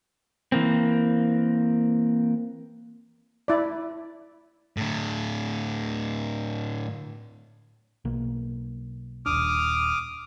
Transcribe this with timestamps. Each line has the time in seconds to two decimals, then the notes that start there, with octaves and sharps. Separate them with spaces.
0.52 E3 A#3 C4
3.48 E4 D5
4.77 A2 D3
8.05 B1 A#3
9.26 D#1 D4 D6 D#6 F6